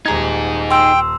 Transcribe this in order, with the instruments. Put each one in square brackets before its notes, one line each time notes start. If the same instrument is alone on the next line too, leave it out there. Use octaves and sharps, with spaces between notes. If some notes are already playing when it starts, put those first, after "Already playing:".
[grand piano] D#1 A#5 G#6 [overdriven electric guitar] D#4 G#4
[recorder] G5 [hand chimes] C6 E6